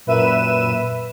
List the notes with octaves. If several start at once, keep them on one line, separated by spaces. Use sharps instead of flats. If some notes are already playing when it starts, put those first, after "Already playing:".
F#2 A#2 B4 E5 D#7 E7